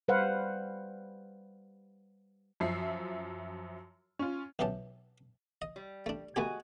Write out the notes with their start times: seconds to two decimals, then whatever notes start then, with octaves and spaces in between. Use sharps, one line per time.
0.08 G3 B4 C5 F5 F#5
2.60 F#2 F3 E5 C7
4.19 C#4 F4
4.59 B1 E3 C#4 G4 A5
5.62 D#5
5.76 G3
6.06 A3 D4
6.36 G#3 A3 B3 F#4 G4 G#5